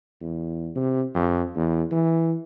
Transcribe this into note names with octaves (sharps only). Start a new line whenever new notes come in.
E2
C3
F2
E2
E3